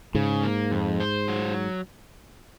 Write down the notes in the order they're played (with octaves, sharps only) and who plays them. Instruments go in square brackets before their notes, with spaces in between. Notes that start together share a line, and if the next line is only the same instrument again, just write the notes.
[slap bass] G#2 [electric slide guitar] C#3
[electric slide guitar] A#3
F2
C5
F#3